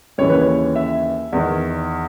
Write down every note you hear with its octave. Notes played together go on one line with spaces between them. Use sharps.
D#2 C#3 E3 C#5
B4
C#5
E5
E2 D#3